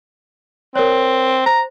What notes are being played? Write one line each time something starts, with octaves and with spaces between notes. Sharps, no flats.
C4 A#4 C#5
C5 A#5